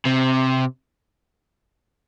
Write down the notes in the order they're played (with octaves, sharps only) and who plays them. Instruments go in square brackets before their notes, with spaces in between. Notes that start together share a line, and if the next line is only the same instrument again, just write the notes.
[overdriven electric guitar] C3